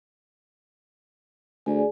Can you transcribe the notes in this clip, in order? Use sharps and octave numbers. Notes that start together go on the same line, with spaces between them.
D2 G#4 D5 G#5